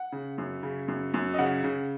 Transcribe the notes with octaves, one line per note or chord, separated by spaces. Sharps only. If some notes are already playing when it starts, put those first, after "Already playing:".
Already playing: F#5
C#3
F#2
C#3
F#2
F#2
D#5
C#3 F#5
C#3